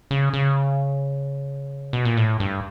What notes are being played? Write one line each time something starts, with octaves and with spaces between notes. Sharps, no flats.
C#3
C#3
B2
A#2
A2
G2